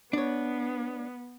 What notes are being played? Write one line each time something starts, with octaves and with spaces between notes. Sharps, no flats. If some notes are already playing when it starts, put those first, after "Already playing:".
B3 D4 C#5